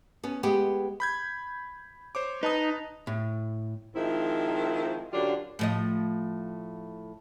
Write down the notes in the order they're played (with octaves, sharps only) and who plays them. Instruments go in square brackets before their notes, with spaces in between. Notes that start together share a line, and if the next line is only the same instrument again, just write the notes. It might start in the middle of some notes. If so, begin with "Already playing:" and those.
[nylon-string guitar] B3 C#4
G#3 B3 G4
[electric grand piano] B5 G6 G#6
C5 C#5 D6
[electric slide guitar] D#4 [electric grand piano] B4 A5 D#6
[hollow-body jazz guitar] A2
[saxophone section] D#3 F3 G#3 C4 E4
F#2 D3 F#3 D4 F4 G4
[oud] A2 F3 D#5